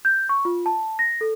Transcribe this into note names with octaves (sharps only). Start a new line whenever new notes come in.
G6
C#6
F4
A5
A#6
A4